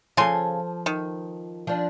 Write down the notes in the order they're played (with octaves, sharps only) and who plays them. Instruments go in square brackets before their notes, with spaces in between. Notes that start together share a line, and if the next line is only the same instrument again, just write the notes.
[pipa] C#3 G#5 C6 [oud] F3 A4
[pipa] D#3
[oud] F3 D4